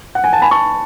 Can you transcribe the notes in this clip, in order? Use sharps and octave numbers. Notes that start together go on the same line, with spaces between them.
F#5
G#5
A5
G#5 B5
A5 C#6